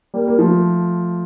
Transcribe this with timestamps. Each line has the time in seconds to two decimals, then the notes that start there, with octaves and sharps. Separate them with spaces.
0.14 G3 A#3
0.28 A#3
0.39 F3 A3